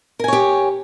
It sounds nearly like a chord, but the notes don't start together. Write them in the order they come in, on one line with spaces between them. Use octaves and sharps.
A#4 G#5 C#5 G4